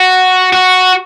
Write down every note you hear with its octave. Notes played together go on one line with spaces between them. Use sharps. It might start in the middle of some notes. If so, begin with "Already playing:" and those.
Already playing: F#4
F#4